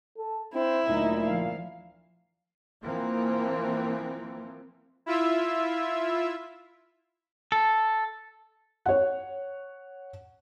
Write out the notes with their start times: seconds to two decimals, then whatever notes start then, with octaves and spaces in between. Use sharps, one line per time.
0.17 A4
0.54 C4 E4
0.87 D2 A#2 F#3 D#4
1.27 F3 F5
2.84 E3 F3 A#3 C4
5.06 E4 F4 E5
7.52 A4
8.86 C#5 F#5